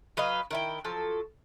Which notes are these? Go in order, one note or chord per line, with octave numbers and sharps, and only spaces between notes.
F#3 B4 D#5 F5
D#3 E4 G5
F3 F#3 A4